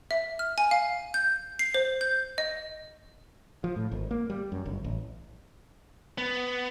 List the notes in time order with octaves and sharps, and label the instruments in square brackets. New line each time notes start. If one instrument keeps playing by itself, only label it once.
[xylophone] E5
F6
G#5
F5
G6
C7
C5
G6
D#5
[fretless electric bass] F3
A2
G#1
A#3
G3
F#2
G1
A1
[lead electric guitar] B3